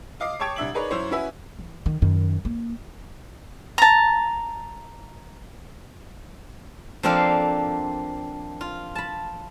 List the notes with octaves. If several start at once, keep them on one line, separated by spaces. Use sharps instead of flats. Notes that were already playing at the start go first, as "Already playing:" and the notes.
D#5 F5 D6 D#6 C7
C#5 G5 A5 C#6 G#6 D7
C2 D4 E5 F#7
D#4 G#4 A#4 B4 C#5 D5
F#2 E4 C5 C#5
C#4 E4 F#4 B4 E5 G#5
E3
D#3
F#2 D#3
A#3
A5 A#5
F3 A#3 C4 D4 A4 F5
F4
A5 B5